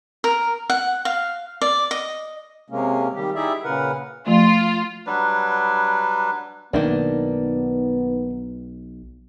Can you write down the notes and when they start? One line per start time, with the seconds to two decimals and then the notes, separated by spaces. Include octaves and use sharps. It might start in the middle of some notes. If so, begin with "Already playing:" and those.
0.24 A#4
0.70 F#5
1.05 F5
1.62 D5
1.91 D#5
2.70 C3 G#3 A#3 C#4
3.15 D#3 G3 G4
3.35 D#4 E4 G4 G#4 D5 E5
3.64 A#2 C#3 A#4 B4 F#5
4.26 F3 A3 F4
5.06 F#3 G3 D4 B4
6.73 B1 D#3 A#3 B3 D4